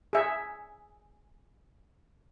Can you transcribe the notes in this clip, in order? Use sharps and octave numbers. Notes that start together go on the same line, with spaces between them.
G#4 E5